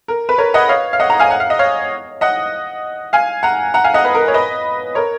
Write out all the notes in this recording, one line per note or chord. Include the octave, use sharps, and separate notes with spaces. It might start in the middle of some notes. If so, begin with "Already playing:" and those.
A#4
B4
A#4 C#5
D#5 F#5
C#5 F5
F5
D#5 F#5
F#5 A#5
F5 G#5
F#5
F5
D#5
C#5 F5
D#5 F#5
F5 G#5
F#5 A#5
F#5 A#5
F5 G#5
D#5 F#5
B4
A#4
C#5
B4 D#5
A#4 C#5